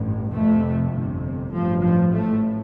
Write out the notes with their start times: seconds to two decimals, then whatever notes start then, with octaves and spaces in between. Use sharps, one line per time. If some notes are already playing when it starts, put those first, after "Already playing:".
Already playing: A1 G2
0.32 F1 F2 C3 A3
0.93 G1 F2 C3
1.52 A1 G2 F3
1.82 F3
2.12 A1 A2 A3